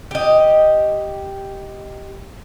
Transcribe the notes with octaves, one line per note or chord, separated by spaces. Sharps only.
G4 D#5